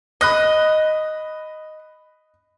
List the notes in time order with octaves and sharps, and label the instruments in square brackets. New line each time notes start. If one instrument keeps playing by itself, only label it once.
[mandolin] D#5 [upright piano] B5 F#6 A#6